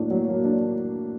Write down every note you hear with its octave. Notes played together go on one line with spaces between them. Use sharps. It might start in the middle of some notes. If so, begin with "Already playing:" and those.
Already playing: A2 F#3 A#3 D4
F#3
A#3
D4